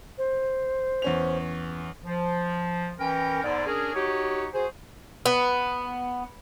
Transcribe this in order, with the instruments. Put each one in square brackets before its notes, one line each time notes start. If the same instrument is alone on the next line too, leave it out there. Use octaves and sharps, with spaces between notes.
[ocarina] C5
[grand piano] E2 C#4 F7
[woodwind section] F3
E3 C#4 A#4 G5
E2 G#2 D3 D5
C#4 D4 G#4 A#4
D#4 F#4 G4 C#5
F#4 G#4 C5
[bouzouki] B3